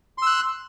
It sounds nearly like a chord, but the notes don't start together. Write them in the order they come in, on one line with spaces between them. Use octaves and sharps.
C6 E6 F#6